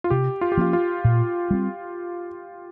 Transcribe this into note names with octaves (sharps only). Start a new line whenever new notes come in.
F4
C3 G4
F4
G4
F3 A#3 C#4 F4
F4
A#2
G3 C4